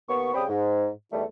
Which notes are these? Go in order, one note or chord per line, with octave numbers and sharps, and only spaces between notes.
D#2 B3 C#6
C#3 G3 C4 G5 B5 D#6
G#2
E2 D#3 G3 A3